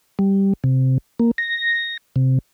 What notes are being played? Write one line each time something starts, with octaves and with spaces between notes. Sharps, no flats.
G3
C3
A#3
A#6
C3